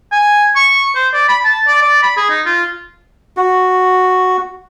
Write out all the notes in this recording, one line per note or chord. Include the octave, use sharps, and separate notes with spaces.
G#5
C#6
C5
D5
B5
A5
D5
D5
B5
G#4
D#4
F4
F#4